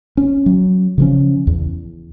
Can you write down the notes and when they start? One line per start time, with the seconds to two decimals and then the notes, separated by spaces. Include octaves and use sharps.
0.17 C#4
0.46 F#3
0.98 C#3 F3 C#4
1.47 E2